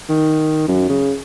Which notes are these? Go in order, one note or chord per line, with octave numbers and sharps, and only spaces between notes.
D#3
F#2
C#3